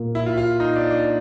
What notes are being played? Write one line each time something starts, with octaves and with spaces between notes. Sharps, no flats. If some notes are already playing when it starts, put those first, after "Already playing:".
Already playing: A#2 A#3
E4
F4
F4
D#4
D4
D4